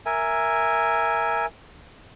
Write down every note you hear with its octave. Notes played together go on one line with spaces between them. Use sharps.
A#4 E5 G#5